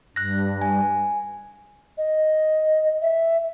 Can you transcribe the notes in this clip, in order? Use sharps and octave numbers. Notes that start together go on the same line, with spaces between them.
G2 F#6 A#6
G#5
D#5
E5